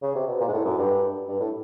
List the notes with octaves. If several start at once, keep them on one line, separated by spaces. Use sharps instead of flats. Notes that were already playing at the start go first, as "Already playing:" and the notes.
C#3
C3
B2
A#2
G#2
A2
F#2
G2
G2
A2